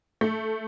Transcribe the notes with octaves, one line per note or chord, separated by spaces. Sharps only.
A3